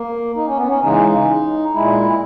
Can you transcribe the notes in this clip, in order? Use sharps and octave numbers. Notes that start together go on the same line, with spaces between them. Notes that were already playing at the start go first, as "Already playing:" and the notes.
Already playing: A#3
D#4
C#4
B3
C#4
C#3 E3 G#3 D#4
A#2 G#3 E4